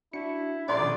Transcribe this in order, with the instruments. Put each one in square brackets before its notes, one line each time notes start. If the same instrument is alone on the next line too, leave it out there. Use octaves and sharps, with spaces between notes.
[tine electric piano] D4 C#7 [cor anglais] E4 [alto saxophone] F#4
[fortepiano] A#1 C6 [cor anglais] F#3 [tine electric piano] A4 F#5 [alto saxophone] D5
[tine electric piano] B2 D#3 D#6 [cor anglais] C#4